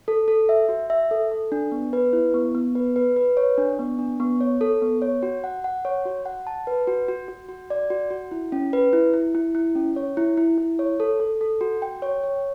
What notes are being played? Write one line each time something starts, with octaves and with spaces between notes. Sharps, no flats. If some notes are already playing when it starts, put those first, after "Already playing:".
A4
A4
E5
F#4
E5
A4
A4
D4
B3
B4
E4
B3
B3
B4
B4
B4
C#5
D4
B3
D4
B3
C#5
A4
B3
C#5
F#4
F#5
F#5
C#5
F#4
F#5
A5
B4
F#4
F#4
F#4
F#4
D5
F#4
F#4
E4
C#4
B4
E4
E4
E4
E4
C#4
C#5
E4
E4
E4
C#5
A4
A4
A4
F#4
G5
C#5
C#5